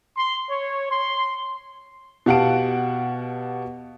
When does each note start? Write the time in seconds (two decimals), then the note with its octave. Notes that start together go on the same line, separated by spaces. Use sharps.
0.17 C6
0.49 C#5
0.91 C6
2.26 B2 G4 F5 F#5 A5 D7